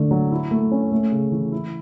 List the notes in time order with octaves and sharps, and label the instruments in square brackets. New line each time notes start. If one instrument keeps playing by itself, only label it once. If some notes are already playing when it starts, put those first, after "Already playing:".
Already playing: [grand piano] D3 A3
F#3
E4
A3
C#4
A3
C#3
E3
E4